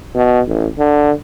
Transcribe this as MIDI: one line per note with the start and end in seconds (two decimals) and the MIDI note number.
0.15 0.40 47
0.47 0.66 33
0.78 1.11 50